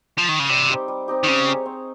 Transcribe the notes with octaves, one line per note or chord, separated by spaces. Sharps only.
F3
D#3
C#3
C3 G3
C4 D#4 G4
G3
C4 D#4 G4
D#3
C#3 C4
D#4 G#4 C#5
C4